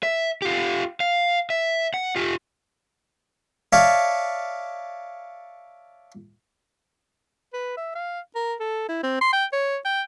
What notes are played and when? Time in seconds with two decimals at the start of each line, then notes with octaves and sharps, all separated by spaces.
0.03 E5
0.42 F4 G4
1.00 F5
1.50 E5
1.94 F#5
2.16 F4 G4
3.73 C#5 D5 E5 F5 A5 C#6
7.53 B4
7.77 E5
7.95 F5
8.35 A#4
8.60 A4
8.89 E4
9.03 C4
9.21 C6
9.33 G5
9.53 C#5
9.85 G5